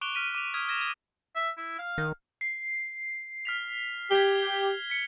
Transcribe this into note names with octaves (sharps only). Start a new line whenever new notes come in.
C#6 D6 F#6 D7 F7 G7
F6 B6 D#7
D6 D#7 F7
D#6 F6 G#6 B6
D#6 F6 G#6 A#6 E7
D#6 G#6
E5
E4
F5
D#3
C7
F6 B6 F7
G4 G#6 G7
B6 C#7